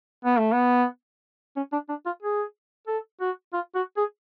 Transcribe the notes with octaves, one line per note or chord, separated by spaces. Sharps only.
B3
A3
B3
C#4
D4
D4
F4
G#4
A4
F#4
F4
F#4
G#4